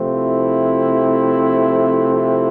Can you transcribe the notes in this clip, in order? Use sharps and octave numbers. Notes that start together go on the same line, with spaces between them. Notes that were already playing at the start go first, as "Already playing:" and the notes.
Already playing: C3 F3 A3 C4
E4
E4